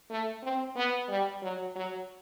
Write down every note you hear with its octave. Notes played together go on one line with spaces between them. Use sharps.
A3
C4
B3
G3
F#3
F#3